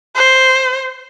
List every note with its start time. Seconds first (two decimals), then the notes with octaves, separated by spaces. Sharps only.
0.16 C5